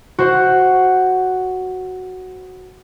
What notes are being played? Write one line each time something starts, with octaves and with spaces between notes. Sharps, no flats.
F#4 C5 F#5